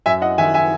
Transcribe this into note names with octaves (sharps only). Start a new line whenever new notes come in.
F#2 E5 G#5
D#5 F#5
D#3 E5 G#5
E5 G#5